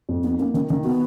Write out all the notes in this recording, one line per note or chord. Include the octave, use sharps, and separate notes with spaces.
F2
B3 D#4
A#3 C#4
D#3 C#4
D#3 C#4
B3 F#4